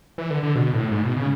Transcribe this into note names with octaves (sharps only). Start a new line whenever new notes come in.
E3
D3
D3
B2
A2
G#2
B2
C#3